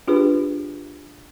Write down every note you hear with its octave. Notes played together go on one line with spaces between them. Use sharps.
D4 F4 G4 G#4 B4